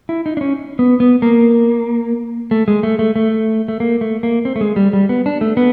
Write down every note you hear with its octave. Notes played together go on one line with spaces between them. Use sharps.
E4
D#4
D4
C#4
B3
B3
A#3
A3
G#3
A3
A3
A3
A3
A#3
A3
A#3
C4
A3
G#3
G3
G3
B3
D4
A3
B3